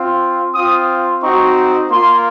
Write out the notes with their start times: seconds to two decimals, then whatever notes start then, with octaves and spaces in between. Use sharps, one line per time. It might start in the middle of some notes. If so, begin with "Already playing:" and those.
Already playing: C4 F4
0.55 C4 F4 D#6
1.23 C4 D#4 F#4 C#6
1.90 A#3 F4 C6